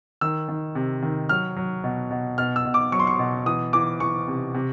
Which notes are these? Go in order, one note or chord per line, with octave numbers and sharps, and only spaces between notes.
D#3 E6
D#3
C3
D#3
F#3 F6
F#3
B2
B2
B2 F6
E6
B2
D6
F#3 C#6
C6
C#6
B2
E3 D#6
E3 D6
E3 C#6
C3
C3